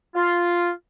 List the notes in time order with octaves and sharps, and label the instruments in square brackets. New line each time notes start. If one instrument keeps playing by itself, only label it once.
[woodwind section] F4